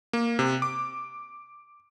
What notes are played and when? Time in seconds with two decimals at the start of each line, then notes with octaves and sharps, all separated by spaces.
0.13 A#3
0.39 C3
0.62 D6